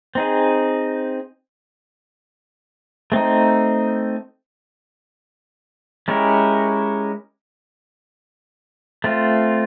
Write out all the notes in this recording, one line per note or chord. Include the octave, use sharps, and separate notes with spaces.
C4 D#4 G#4
A3 C4 D#4
G#3 C#4 E4 G4 A#4
A3 C4 F4